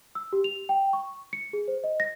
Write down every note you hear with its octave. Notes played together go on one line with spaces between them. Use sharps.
E6
G4
F7
G5
C#6
C#7
G#4
C5
D#5
A#6